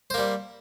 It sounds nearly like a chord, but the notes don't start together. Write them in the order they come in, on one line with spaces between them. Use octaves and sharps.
C5 A#3 G3